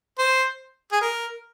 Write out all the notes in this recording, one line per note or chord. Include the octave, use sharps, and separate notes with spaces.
C5
G#4
A#4